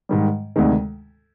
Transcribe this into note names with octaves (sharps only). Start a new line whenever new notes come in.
G#2 D#3 G3
D2 C3 D#3 G#3